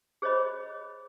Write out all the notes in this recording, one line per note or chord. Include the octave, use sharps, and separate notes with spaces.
G#4 C5 C#5 D#5 B5